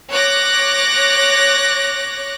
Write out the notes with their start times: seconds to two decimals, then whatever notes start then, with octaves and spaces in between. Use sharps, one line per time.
0.11 C#5 D6 F#6 A#6